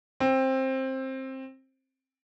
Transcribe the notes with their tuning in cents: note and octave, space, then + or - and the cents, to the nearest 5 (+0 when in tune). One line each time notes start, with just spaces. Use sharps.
C4 +15